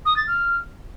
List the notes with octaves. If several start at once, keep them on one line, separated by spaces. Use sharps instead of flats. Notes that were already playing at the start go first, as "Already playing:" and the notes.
D#6
A6
F6